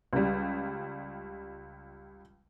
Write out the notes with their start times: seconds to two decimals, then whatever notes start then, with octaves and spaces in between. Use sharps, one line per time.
0.13 C#2 G3